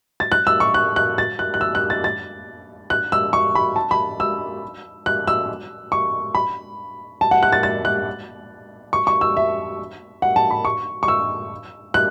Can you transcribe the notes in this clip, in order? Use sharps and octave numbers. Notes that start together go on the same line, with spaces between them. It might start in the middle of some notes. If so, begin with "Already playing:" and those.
A6
F#6
E6
C#6
F#6
F#6
A6
F#6
F#6
E6
F#6
A6
A6
F#6
E6
C#6
B5
A5
B5
E6
F#6
E6
C#6
B5
A5
F#5
F#6
A6
A6
F#6
C#6
C#6
E6
E5
F#5
A5
B5
C#6
C#6
E6
F#6